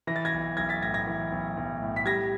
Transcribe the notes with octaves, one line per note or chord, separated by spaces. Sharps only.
E3 A#6
A6
G#6 A#6
B1
B1 G#6 A#6
A6 B6
A2 G#6 A#6
G#6 A#6
E3
B1
B1
A2
B6
G3 G#6 A#6